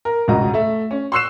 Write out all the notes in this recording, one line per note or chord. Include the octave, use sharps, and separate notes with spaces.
A#4
E1 C#2 G#2 F#4 D#5 A#5
A3 E5
C#4
C6 C#6 E6 F#6 C7 E7